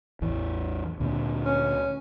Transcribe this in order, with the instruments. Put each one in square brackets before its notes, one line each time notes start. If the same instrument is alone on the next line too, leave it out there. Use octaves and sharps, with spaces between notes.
[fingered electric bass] A1 E2 E3
D2 A#2 D3
[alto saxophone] C#4